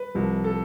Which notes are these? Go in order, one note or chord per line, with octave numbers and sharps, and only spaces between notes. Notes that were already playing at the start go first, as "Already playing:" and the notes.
Already playing: B4
C2 C3 F3
A4